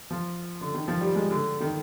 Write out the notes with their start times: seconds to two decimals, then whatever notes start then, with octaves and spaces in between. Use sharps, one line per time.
0.11 F3
0.61 D3
0.74 D#3
0.88 F3
1.01 G3
1.15 G#3
1.31 D3
1.61 D#3